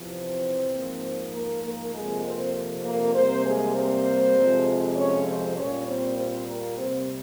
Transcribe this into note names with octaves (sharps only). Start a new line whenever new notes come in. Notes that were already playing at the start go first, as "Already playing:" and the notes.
Already playing: E2 C3 F3
C4 C5
G#2 F3 A#3
A#3 A#4
A#3 A#4
F2 C3 F3 G#3 A#3 G#4
C4 C5
A#3 A#4
C3 G3 A#3 C4 C5
G#3 G#4
C4 C5
F2 C3 F3 G#3
C#4 C#5
C4 C5
A#2 G3 A#3 C#4 C#5
C4 C5
C4 C5
A#3 A#4
C3 G3 A#3 C4 C5